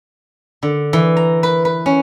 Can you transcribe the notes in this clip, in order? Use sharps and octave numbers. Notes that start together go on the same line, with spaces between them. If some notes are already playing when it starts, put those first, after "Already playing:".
D3
E3
A#5
B4
B4
C#4